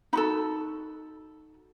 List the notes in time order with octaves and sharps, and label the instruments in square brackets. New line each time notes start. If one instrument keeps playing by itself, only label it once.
[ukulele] D#4 F#4 A4 B5